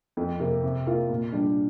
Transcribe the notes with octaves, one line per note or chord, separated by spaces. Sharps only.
F2
C3 A#3 G4
C3
A#3 F4
A#2
G3 D4